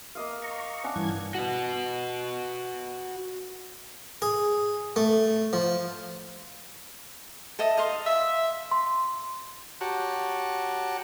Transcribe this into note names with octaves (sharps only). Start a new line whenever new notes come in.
A#3 D#5 F5
A#5 C#6
C#4 D4 F#5
G2 E3 G#6
F#4 B4
G#4
A3
F3
A4 D#5 E5
D#5 F5 C6
E5
C6
F#4 G4 C#5 F#5 A5 A#5